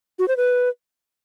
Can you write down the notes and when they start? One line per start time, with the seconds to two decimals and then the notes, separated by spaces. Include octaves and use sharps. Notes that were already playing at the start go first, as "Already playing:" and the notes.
0.19 F#4
0.28 C5
0.37 B4